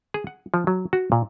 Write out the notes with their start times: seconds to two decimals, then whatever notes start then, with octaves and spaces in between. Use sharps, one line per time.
0.14 G#4
0.27 F#5
0.54 F3
0.67 F#3
0.93 F#4
1.12 A#2